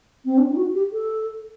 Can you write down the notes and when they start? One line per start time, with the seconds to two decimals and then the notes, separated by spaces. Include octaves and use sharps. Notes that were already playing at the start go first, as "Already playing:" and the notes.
0.25 C4
0.38 D4
0.50 D#4
0.57 F#4
0.75 G4
0.93 A4